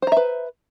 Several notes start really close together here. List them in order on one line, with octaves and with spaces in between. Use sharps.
C5 A#5 E5 B4